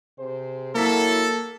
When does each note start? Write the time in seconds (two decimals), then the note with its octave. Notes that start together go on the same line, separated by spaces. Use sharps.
0.19 C3 G#4 C5
0.75 F#3 A#3 E4 A4 B6